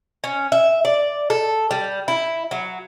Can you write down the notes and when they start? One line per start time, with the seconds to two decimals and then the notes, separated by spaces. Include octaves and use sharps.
0.24 C#4
0.52 E5
0.85 D5
1.30 A4
1.71 G3
2.08 E4
2.51 F#3